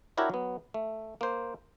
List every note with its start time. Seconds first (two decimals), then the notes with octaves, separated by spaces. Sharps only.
0.17 D4 E4 F#4 G4 A#4 C#5
0.30 F#3 B3
0.74 A3
1.21 A#3 C5